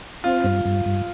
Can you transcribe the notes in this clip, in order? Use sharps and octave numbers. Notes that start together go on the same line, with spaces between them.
C4 F4
G2
G2
G2